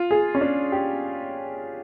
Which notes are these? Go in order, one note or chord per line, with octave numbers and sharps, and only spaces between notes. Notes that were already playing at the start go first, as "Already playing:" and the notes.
Already playing: F4
G#4
C#4
D4
G4